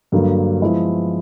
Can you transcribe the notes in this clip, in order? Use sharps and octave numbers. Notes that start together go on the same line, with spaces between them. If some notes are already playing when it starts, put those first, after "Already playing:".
G2 D3 F#3 A#3
F3 G#3 B3 E4